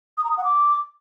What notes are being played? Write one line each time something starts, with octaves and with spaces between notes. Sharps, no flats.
D#6
A#5
D#6
F#5
D6